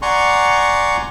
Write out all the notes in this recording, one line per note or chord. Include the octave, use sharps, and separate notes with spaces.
D5 F#5 G#5 A#5 C6 C#6